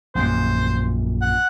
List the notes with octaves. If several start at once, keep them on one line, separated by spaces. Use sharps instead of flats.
A#1 F#2 A#2 C5
F#5